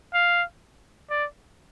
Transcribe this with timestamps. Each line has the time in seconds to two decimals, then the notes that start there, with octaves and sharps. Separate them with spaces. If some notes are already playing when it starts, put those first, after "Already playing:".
0.14 F5
1.10 D5